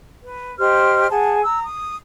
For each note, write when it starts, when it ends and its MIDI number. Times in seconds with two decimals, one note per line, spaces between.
0.24 0.58 71
0.59 1.07 67
0.59 1.07 72
0.59 1.07 75
0.59 1.07 89
1.10 1.41 68
1.10 1.41 78
1.10 1.41 81
1.44 1.63 82
1.44 1.63 88
1.63 1.95 87